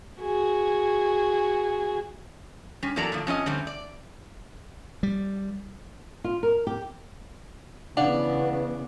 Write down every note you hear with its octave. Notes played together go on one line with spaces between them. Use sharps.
F#4 G#4
G3 C#4
E2 F#3 A#3 A4 D5 A#5
A2 D3 F3
F2 C#4 E4 D#5
D3 G3 A3 C4 C#4
D5
G3
F4
A#4
G4
C#3 E3 B3 D4 F5 F#5